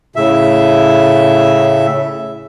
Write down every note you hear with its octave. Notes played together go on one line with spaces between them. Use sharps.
A2 C#3 E5